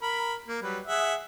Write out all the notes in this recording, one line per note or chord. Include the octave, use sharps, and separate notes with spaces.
A#4 B5
A#3
F#3 G3 B4
G#4 E5 F#5